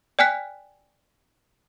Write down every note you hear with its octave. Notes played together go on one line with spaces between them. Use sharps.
D5 G5 G#5 F6 F#6 B6